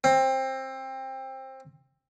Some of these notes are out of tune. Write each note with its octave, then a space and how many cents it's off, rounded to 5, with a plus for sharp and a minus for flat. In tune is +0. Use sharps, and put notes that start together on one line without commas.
C4 +20